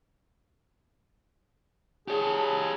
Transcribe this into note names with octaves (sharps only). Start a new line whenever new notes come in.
G4 G#4 C#5 A5